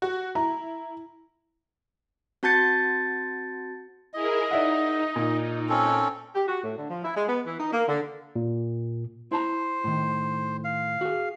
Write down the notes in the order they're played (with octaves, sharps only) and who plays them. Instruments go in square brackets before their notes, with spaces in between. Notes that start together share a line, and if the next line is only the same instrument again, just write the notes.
[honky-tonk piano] F#4
[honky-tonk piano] E4 [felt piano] A#5
[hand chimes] C4 F#4 A5 G6 A6 C#7
[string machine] E4 G#4 A#4 [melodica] D#5
[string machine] D#4 [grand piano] D5 E5 F#5
[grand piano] A#2
[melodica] C4 C#4 A4
[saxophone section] G4
F#4
A2
D3
F3
E4
G#3
B3
E3
D#4
A#3
D3
[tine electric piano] A#2
[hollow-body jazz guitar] E4 A5 A#5 [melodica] C5
[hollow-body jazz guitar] A2 D#3
[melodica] F5
[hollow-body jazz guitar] F#4 G#4